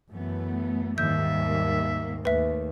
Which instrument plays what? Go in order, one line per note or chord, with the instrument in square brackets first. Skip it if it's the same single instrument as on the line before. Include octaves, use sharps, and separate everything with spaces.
[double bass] F#2 E3 [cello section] A3 B3
[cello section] D#2 G3 A#3 [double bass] G#2 D#3 [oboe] E5 [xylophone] G6
[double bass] D#2 [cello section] A3 [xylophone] B4 E5